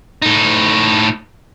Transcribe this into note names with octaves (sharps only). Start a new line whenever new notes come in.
A2 D#4